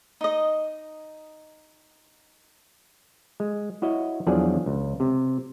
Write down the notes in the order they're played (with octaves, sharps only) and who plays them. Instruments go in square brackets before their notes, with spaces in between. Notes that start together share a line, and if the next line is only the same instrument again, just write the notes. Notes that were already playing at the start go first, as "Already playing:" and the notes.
[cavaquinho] D#4 D#5
[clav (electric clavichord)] G#3
E4 F#4 C#5 D#5
E2 F3 F#3 D4 G#4 D5
C#2
C3